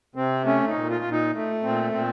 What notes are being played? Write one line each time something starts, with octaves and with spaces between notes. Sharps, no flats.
C3 C4
A3 C#4
D#4
A#2
F4
A#2
D#4
A3
A#2 C4
A#2 C4